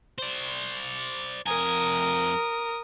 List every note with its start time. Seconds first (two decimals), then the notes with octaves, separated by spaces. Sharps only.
0.18 C5 D5
1.46 F2 A#4 G#5 D#6